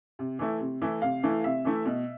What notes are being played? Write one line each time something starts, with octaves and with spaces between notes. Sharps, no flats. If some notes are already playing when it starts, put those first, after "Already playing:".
C3
E3 A3 E4
C3
E3 A3 E4
C3 F5
E3 A3 E4
C3 E5
E3 A3 E4
B2